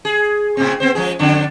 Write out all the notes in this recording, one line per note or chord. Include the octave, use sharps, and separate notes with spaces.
G#4
A2 C#3 C4
B3 C4 C5
F3 G#3 G#4
F2 D3 D4